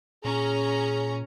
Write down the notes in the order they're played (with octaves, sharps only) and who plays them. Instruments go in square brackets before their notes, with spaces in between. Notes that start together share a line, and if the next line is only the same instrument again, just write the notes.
[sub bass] A#2 [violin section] C#4 A#5 [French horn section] G#4